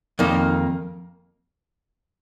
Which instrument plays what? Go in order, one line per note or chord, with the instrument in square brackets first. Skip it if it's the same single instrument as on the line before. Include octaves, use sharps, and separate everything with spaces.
[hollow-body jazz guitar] F2 D#3 A#3 D#4